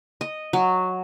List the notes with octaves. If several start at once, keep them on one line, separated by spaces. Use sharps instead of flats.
D#5
F#3